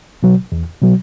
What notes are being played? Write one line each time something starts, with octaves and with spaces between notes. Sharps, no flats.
B2 F#3
E2
B2 F#3